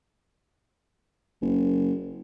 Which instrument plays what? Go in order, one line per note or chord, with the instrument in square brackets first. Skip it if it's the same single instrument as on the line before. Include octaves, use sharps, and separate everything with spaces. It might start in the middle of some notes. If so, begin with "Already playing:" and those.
[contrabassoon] F#1